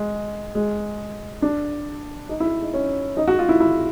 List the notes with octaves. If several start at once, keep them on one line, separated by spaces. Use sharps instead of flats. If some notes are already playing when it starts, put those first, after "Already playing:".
Already playing: G#3
G#3
D4
D#4
E4
D#4
C#4
D#4
F#4
F4
E4
E4